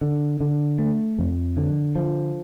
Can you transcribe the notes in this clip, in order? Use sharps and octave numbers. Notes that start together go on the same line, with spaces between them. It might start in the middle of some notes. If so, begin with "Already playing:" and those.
D3
D3
A3
F2
D3
F3